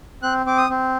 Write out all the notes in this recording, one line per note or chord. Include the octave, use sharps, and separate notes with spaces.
C4 F#6
C4 D6
D#6
C4